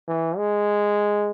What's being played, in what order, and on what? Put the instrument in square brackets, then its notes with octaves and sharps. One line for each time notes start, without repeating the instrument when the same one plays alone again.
[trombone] E3
G#3